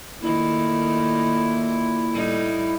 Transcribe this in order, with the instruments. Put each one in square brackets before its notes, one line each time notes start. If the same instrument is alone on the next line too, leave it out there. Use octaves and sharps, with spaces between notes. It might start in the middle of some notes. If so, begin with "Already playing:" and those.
[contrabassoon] A#2 [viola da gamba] D#3 A3 [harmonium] E4
[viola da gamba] A2 G3 D#4